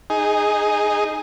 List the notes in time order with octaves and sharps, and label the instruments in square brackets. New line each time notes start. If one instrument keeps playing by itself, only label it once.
[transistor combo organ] D#4 G#4